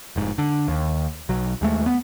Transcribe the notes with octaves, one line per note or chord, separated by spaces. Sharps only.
F1 G#2
D3
D#2
B1 F#3
D#2 G#3 A3
B3